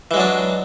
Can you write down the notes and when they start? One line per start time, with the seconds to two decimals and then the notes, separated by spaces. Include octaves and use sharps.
0.11 E3
0.14 G#3
0.17 F#3
0.20 D4